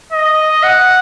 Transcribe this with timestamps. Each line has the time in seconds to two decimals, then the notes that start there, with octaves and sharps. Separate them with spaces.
0.12 D#5
0.63 F#5